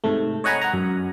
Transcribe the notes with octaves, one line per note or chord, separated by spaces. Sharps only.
G#2 C3 A3
C#5 D#5 F#5 G#5 A#5 B5
F#5 A#5
F#2